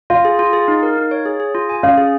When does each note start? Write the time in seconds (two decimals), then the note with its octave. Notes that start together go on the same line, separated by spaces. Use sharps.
0.10 F4 F5
0.25 G#4
0.39 F4
0.53 G#4
0.68 D#4
0.83 A#4
0.97 D#4
1.11 C#5
1.26 G#4
1.40 G#4
1.54 F4
1.69 G#5
1.83 C#4 F5
1.98 G#4